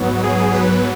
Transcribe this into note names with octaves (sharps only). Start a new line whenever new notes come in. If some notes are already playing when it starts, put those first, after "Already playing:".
Already playing: G#2 F#3 B3
G#4
B4